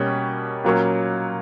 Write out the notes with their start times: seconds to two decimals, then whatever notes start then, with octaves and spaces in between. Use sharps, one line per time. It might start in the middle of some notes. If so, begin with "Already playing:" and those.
Already playing: B2 G3 A#3 C#4
0.64 A#2 F#3 A#3 C#4